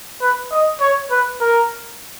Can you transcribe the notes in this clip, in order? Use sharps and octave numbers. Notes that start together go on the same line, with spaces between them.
B4
D#5
C#5
B4
A#4